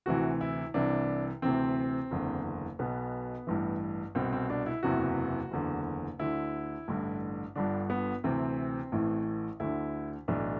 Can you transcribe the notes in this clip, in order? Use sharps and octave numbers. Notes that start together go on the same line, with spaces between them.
D2 C3 E3 F#4
E4
C2 C3 E3 D4
D2 C3 E3 C4
F#1 E2 D3
B1 B2 B3
A1 G2 E3
C2 B2 C4
C4
D4
E4
F#1 E2 C3 E3 F#4
F#1 E2 D3
D2 D3 E4
A1 G2 D3
G1 G2 D3 D4
B3
D2 C3 E3 C4
A1 A2 E3
D2 D3 E4
B1 A2 E3 D4